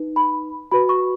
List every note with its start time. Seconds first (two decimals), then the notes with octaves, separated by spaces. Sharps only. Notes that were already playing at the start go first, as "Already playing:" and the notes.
Already playing: D#4 B4
0.16 B5
0.71 F#4 B4 B5
0.89 C#6